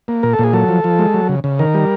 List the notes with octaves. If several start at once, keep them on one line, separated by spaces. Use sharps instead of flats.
A#3
A#2 A#4
A4
A#2 G#4
F#3 A4
F3
F3
G#3
F#3
C#3
C#3
D#3 A#4
G3